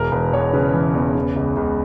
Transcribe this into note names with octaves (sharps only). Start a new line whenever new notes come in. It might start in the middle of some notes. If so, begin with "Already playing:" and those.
Already playing: E1 A#4
E1 B4
E2 C#5
C#3 B4
E3
E2
C#3
C#2
C#2